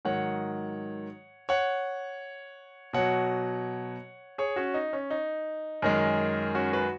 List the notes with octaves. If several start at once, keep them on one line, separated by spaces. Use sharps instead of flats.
G#2 D#3 F#3 C#5 F#5
C#5 F#5
B2 F#3 C#5 F#5
G#4 C#5
C#4 F#4
D#4
C#4
D#4
F#2 D#3 G#3
C#4 F#4
F#4 B4